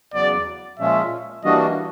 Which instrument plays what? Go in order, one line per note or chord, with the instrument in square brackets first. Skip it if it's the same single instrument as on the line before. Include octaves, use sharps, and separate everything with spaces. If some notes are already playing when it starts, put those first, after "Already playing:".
[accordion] E2 C#3 F#3 B3 [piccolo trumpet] D5
[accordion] A#2 F3 G#3 C#4 F4 [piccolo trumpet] E5
[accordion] E3 G3 A#3 D4 F#4 [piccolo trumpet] D#5